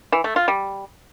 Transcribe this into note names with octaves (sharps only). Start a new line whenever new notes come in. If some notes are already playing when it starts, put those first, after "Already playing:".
E3
A3
F4
G3